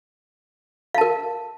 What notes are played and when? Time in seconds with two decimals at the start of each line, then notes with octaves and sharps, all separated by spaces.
0.95 F5
0.98 A5
1.01 A#4